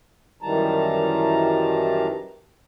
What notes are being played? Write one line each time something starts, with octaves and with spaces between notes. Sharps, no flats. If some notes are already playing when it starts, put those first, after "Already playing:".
F#2 D#3 E3 G3 A5 A#5